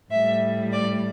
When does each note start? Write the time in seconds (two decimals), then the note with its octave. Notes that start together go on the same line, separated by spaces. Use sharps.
0.11 A2 G3 E5
0.72 D5